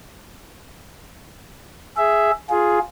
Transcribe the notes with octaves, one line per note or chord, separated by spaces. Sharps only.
G#4 E5
F4 G#4